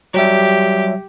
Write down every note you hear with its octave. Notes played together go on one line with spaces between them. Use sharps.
F#3 G3 G4 E5